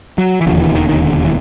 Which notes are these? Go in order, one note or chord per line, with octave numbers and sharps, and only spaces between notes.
F#3
E3
E1 D#2 D3 F3
E3
D#3
D#3
D3
E3